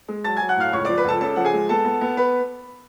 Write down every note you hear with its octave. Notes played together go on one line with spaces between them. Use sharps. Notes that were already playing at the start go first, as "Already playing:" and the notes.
G#3
F#3 A5 A6
F#3 G#5 G#6
F#5 F#6
A2 F5 F6
C#2 C#5 C#6
F3 D5 D6
B4 B5
C#2 A4 A5
C#3 A4 A5
F3 F#5
G#4 G#5
G#3
B3 A4 A5
B3
B3
B4 B5